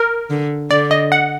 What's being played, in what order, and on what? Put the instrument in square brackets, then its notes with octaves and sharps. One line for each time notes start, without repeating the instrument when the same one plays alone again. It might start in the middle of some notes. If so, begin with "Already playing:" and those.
Already playing: [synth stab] A#4
[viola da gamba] D3
[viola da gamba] D3 [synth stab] D5
[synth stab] D#5
F#5